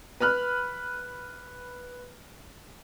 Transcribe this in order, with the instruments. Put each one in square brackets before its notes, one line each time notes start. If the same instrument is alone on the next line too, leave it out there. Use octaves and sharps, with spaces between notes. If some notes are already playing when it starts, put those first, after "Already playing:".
[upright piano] B4 B5 F6 F#6